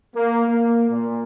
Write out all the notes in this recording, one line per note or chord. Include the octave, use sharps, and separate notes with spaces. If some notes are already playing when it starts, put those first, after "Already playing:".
A#3
A#3
A#2